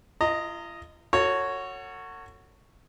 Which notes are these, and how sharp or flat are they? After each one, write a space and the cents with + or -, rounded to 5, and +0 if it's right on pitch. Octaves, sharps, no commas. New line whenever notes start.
F4 -45 D#5 +0 A#5 -25
F#4 +0 A4 +40 C#5 +0